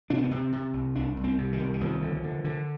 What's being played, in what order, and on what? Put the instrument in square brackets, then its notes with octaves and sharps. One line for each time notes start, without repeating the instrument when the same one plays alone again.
[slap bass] C3 D4
C4
B3
C3 C4
C3
C2
C2 D4
C2
C4
C3
D#3
C2
D#3
D#2 F3
D3
D3
D3